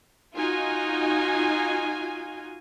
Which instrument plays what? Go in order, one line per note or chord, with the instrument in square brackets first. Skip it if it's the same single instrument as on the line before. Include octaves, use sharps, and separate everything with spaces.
[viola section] D#4 F4 F#4 G#5